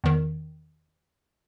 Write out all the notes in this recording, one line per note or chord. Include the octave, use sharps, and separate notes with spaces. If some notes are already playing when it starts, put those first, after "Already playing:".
E2 D#3